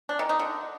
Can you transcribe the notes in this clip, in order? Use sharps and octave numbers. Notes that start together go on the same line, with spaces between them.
D4
D#3
D#4
D3